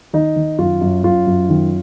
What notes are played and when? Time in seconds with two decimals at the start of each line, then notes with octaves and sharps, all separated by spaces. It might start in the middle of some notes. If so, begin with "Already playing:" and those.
0.13 D#3 D#4
0.36 D#3
0.58 F#2 F4
0.81 F#2
1.04 F#2 F4
1.27 F#2
1.49 D#3